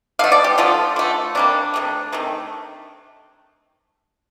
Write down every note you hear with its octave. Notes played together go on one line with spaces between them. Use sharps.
D3 A3 F5
D5
G4
D3 F3 A3 F4
D3 A3
C3 G3 A#3 D4
C3 D#3 A3
C3 D#3 A3